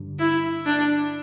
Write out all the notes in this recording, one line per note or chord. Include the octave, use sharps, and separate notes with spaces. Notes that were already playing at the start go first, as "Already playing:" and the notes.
Already playing: G2 D3 G3
E4
D4